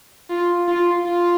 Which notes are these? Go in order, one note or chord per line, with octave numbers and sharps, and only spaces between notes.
F4
F4
F4